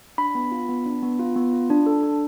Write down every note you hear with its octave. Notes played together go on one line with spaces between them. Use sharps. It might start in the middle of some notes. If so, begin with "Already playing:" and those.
D4 B5
B3
F4
B3
D4
B3
F4
B3
F4
D4
A4
D4